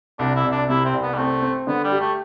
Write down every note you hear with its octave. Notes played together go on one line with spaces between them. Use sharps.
C2 D4
E4
C2
D4
C3 E4
C4
C2
B3
G3
A3 C4
C4
D3 B3
G3
G4
A3